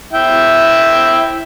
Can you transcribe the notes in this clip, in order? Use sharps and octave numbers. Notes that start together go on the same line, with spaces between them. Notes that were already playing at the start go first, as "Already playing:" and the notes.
E4 E5 G5